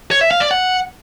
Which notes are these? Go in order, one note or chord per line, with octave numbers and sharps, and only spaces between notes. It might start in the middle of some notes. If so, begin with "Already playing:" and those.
C#5
E5
F5
D5
F#5